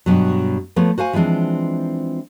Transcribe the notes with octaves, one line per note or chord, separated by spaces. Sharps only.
G2 B2 F#3
F3 A3 B3 C#5
F#4 C5 F5 G#5
E3 F3 G#3 C4 D4